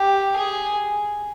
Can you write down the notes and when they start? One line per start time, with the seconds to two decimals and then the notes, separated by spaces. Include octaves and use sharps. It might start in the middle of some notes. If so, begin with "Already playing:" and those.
Already playing: G4
0.36 G#4